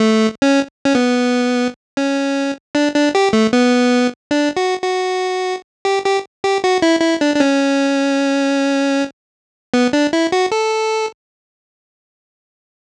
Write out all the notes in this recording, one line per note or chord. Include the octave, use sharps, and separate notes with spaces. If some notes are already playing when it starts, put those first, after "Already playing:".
Already playing: A3
C#4
C#4
B3
C#4
D4
D4
G4
A3
B3
D4
F#4
F#4
G4
G4
G4
F#4
E4
E4
D4
D4
C#4
B3
D4
E4
F#4
A4